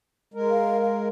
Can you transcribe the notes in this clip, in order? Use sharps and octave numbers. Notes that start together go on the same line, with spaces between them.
G#3 A#4
F5
F5